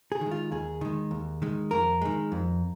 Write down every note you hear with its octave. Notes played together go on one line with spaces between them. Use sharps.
G#4
D#3 G#3
F4
D#2 G#4
D#3 G#3
D#2
D#3 G#3
F2 A#4
D#3 G#3
F2